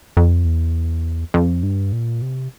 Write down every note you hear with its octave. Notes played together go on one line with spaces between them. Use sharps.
F2
E2
F2
G2
A#2
C3